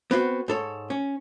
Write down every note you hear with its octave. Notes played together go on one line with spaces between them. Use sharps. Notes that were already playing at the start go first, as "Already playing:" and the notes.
B3 C4 F4 F#4
G#2 A4 C#5
C#4